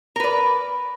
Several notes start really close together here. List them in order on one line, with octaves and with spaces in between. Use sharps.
A#4 B4 D5